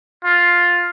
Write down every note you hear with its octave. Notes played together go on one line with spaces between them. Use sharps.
F4